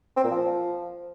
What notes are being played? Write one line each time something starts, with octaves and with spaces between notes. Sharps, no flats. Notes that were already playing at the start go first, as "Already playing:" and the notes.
C4
A#2
F3